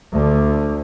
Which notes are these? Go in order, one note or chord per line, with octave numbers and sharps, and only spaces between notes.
D2 D3